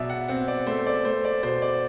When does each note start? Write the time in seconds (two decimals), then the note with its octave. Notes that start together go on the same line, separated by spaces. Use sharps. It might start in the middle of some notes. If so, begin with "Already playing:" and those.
Already playing: B2 F#3 D5 E5
0.10 F#5
0.28 C4 F#5
0.48 D5
0.67 A3 C5
0.87 D5
1.05 A3 C5
1.25 D5
1.43 B2 C5
1.62 D5